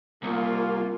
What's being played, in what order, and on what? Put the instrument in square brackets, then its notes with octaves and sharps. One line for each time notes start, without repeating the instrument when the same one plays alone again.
[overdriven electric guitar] C2 [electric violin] A#3 F4